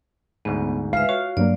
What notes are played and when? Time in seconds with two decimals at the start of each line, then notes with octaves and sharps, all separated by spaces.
0.45 D2 G#2 B3
0.93 G#3 B4 E5 F5
1.09 F#4 C#5
1.37 G2 F#3 A#3 D5